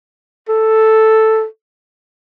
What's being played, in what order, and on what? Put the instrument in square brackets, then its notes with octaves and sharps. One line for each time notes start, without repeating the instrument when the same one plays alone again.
[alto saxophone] A4